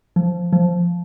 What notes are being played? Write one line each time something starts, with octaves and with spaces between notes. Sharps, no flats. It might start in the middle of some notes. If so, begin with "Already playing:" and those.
F3
F3